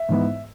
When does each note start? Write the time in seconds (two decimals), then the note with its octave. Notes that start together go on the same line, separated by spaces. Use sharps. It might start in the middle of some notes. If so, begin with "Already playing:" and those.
Already playing: E5
0.09 G#2 E3 B3 D#4